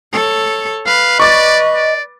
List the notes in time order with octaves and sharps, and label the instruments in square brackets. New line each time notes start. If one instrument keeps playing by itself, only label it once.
[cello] A4 C#5
[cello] B4 [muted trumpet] F5
[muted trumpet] D5 [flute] D#5 [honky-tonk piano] C#6 D6 A6
[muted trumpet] D5